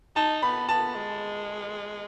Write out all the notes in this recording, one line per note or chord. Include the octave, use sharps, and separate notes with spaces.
D#4 A5
B3 B5
B3 A5
G#3